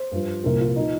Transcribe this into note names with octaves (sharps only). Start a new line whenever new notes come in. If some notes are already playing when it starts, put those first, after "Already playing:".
Already playing: C5
G2 F3
C2 A#2 F3 A#4
F4
F3 D#4